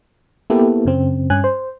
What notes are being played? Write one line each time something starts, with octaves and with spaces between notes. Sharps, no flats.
A#3 B3 E4 G4 A4
F#2 C#3 C4
G2 C#4 G#5 F#6
C5